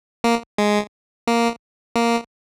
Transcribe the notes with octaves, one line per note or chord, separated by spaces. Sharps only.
A#3
G#3
A#3
A#3